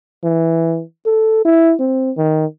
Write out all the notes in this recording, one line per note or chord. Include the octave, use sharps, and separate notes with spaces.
E3
A4
E4
C4
D#3